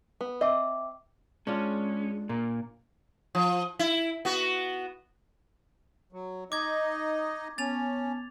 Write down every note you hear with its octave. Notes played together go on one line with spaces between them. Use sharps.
B3
C4 D#5 E5 D6
G#3 C#4 D4 F4
A#2 A#3
F3
E4
B3 F#4
F#3
D#4 D#5 D6 G#6
B3 C#4 A5 A6 F7